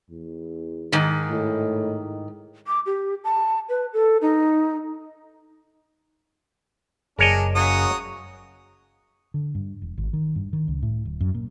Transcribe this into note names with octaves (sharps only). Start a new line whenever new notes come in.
E2
G#2 D#3
A2
D6
G4
A5
B4
A4
D#4
F#1 D4 G#4 A#4 C#5 D#5
C#3 F#3 C#6 D#6
D3
G2
E1
G#1
D#3
G2
D#3
C#2
A2
D1
F#2
A#2